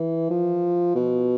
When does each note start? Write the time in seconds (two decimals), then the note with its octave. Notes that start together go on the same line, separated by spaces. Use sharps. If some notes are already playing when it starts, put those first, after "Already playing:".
Already playing: E3
0.30 F3
0.95 B2